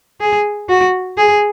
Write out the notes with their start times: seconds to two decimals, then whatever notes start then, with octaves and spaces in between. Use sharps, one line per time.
0.21 G#4
0.69 F#4
1.18 G#4